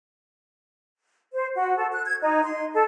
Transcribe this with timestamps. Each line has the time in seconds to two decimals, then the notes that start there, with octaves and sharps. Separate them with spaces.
1.33 C5
1.56 F#4
1.76 A4
1.93 F#6
2.05 G#6
2.22 D#4
2.44 C6
2.74 A4